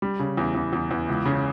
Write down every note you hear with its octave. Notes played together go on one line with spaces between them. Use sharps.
G3
C#3
E2
E2
E2
E2
C#2
C#3